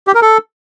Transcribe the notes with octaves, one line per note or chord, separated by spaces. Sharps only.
G4
A#4
A4